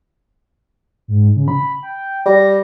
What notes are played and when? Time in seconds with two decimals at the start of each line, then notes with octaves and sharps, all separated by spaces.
1.08 G#2
1.36 C#3
1.48 B5
1.83 G5
2.26 G3 A#6